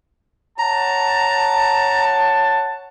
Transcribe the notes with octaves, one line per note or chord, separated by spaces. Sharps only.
C#5 F#5 A5 A#5